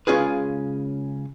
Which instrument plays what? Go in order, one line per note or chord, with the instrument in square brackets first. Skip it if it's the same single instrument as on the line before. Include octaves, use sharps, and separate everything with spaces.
[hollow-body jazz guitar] C#3 G#3 C#4 F4 G#4 B4